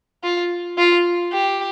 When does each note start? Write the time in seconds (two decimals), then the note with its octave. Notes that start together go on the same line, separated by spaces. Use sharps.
0.24 F4
0.78 F4
1.32 G4